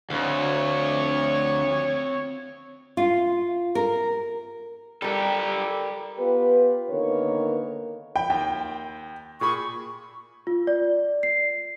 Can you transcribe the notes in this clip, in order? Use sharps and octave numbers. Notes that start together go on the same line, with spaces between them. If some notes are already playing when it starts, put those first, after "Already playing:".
D2 C4 C#5 F5
F4
A#4
G3 G4 A4 A#4
B3 F4 G4 B4
D3 D#3 A#3 B3 A#4 C#5
G5 B5
D#2 G5
A#2 G#4 B5 C#6
F4
D5
C7